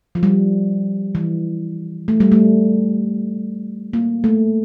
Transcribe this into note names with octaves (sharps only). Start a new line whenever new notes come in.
F3
G3
E3
A3
G3
A3
A#3
A3